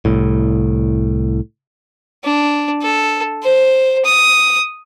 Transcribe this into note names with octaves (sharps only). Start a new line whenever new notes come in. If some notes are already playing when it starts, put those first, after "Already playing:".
C2 A2
D4
A4
C5
D#6